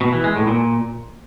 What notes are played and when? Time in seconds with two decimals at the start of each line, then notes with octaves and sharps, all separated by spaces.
0.01 B2
0.12 E3
0.24 G#3
0.36 A2
0.47 A#2